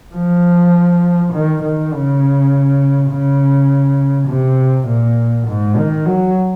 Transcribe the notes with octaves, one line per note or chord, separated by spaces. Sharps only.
F3
D#3
D#3
C#3
C#3
C3
A#2
G#2
D#3
F#3